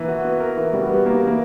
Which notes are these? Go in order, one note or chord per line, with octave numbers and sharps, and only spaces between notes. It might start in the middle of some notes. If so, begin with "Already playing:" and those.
Already playing: E3 A#3
F#4
B3
A#4
E3
G3 F#4
B3
A#3 A#4
E3
A#3